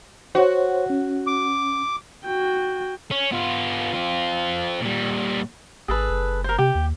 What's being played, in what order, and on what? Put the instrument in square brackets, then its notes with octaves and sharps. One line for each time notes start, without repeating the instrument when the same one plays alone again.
[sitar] F#4 [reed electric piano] C5 C#5
[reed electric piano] C#4
[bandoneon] D6
[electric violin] F#4 G5
[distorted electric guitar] C#4
B3 F4
C4 F4
A#2 G3
[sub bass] G#1 [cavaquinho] G#4 A4 B4
[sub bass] F#1
[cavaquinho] A#4 C5
[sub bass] C3 [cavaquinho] G4
[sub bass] D#2